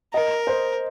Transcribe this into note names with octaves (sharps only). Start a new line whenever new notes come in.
A#4 D#5
C5